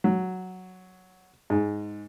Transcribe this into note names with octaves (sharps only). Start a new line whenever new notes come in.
F#3
G#2